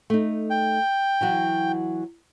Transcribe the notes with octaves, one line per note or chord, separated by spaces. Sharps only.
A3 D#4
G5
E3 F#3 F#4